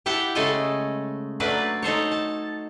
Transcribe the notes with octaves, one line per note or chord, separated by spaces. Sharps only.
E4 G4 F#5 G5 A5
C#3 G#3 A3 A4 D#5 G#5
F#3 A3 A#3 D4 B4 D5
D#4 A4 C5 C#5
A5